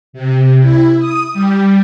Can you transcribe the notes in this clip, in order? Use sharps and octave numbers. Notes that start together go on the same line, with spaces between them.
C3
E4
D#6
G3